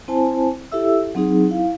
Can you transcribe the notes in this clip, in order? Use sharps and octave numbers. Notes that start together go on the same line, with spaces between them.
C4 E4 C5 G#5 A5
E4 G4 A4 E5 E6
F#3 C4 D#4 G#4
E4 F5